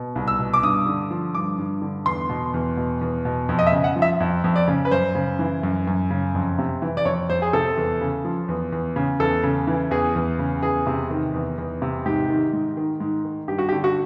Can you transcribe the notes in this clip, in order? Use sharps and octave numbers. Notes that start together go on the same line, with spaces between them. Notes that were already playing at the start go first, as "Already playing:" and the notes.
Already playing: B2
C2
E6
B2
D6
G2 D#6
D3
F3
G2 D6
G2
D3
E2 C6
B2
E2
B2
E2
B2
F2
D#5
E5
C#3
F#5
F3
E5
F2
F2
D5
C#3
B4
F#2 C5
C#3
E3
F#2
F#2
C#3
F2
C3
E3
D5
F2 C#5
F2 C5
G#4
C3 A4
E2
C#3
F3
E2
E2
C#3
E2 A4
C#3
E3
E2 G#4
E2
C#3
E2 G#4
C3
D#3
E2
E2
C3
G#2 G4
D#3
G#2
D#3
G#2
D#3
G2 G4
F#4
G4
D3
F#4